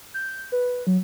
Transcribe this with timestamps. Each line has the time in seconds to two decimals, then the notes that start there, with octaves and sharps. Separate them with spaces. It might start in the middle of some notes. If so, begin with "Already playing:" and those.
0.14 G6
0.52 B4
0.87 F#3